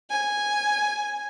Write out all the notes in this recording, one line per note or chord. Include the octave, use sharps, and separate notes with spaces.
G#5